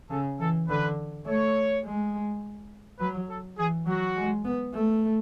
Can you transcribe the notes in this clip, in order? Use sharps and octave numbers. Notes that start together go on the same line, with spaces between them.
C#3 A4
E3 A4
D3 B4
A3 C#5
G#3
F#3 B4
A4
E3 G#4
F#3 F#4
G#3
B3
A3